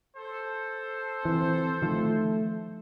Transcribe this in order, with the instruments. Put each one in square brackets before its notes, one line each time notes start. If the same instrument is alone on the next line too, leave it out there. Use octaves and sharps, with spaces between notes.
[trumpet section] A4 C5
[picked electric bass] E3 [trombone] C4
[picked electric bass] D#3 F3 [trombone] A3